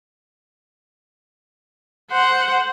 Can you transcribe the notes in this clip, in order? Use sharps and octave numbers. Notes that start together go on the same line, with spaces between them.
C5 F#5